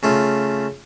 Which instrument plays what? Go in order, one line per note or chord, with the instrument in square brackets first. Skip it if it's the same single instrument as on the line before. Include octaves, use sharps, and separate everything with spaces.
[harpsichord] C#3 A3 F4